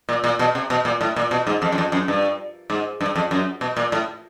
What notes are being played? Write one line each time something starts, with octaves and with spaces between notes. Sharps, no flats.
A#2
A#2
B2
C3
B2
A#2
A2
A#2
B2
G#2
F2
F#2
F2
F#2
G2
G#2
G2
F2
F#2
B2
A#2
A2